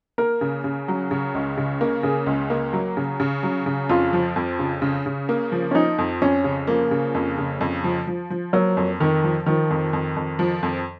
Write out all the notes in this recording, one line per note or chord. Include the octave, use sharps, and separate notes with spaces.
A#3 A#4
C#3
C#3
F#3
C#3
C#2
C#3
A#3
C#3 G#4
C#2
A#3
F#3
C#3
C#3
F#3
C#3
F2 F4
F3
F2
C#3
C#3
C#3
A#3
F3
C#4
F3 D#4
F2
F2 C#4
C#3
F3 A#3
C#3
F2
C#3
F2
F3
F3
F3
F#3 A#3
F2
F2 D#3
F3
D#3 F3
F2
F2
F2
F3
F2